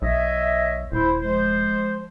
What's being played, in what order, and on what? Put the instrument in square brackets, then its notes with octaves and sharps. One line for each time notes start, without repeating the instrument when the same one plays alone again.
[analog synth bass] B1 [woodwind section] C#5 D#5 E5
[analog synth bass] D#1 [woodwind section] E4 C5
[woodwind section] F3 G#3 C5